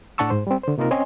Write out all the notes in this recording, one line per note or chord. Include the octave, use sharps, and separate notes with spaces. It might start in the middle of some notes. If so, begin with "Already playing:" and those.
A2 D4 F#5 A5 C#6 E6
G#2 C5
G3 C4
D3 C5
C3 A#3 D#4 F4 A#4
C4 C#4 C#5 D#5 G#5 C6